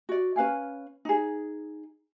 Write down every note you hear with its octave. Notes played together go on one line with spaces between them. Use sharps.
F#4 D5
C#4 B4 F5 G#5
D#4 G#4